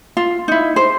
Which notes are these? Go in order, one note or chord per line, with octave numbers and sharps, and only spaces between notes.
F4
D#4 E4
C5